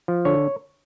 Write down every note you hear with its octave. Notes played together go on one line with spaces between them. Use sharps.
F3
D3 C#5